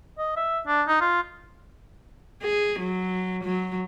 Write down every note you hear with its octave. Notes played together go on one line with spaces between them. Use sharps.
D#5
E5
D4
D#4
F4
G#4
F#3
F#3